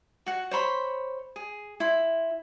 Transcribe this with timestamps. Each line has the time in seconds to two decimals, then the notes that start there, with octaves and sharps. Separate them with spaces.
0.26 F#4 F#5
0.51 C5 C#5 B5 C6
1.36 G#4
1.80 E4 C6